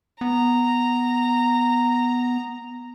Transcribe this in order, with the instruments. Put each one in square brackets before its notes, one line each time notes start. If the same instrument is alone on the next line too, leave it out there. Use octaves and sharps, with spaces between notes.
[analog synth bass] B3 [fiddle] A#5